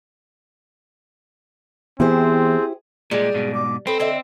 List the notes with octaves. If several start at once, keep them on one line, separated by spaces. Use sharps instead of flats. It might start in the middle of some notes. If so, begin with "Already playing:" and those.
E3 B3 C4 E4 G4 G#4 C5
A#2 G3 G#3 G#4
G#2 B2
D6
C4 A4 B4 D#5
D3 C4 D#5 E5